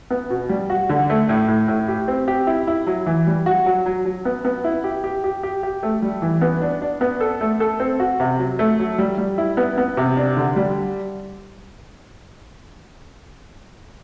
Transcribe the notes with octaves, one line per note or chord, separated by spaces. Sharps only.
B3
B2
G3
F#4
D3
A3
A2
A2
A2
G4
C4
G4
E4
E4
F#3
E3
G3
F#4
F#3
F#3
F#3
B3
B3
E4
G4
G4
G4
G4
G4
A3
G3
E3
B3
D4
D4
B3
A4
A3
A4
C4
F#4
C3
F#3
A3
F#3
G3
G3
E4
B3
B3
C3
D4
D3
G3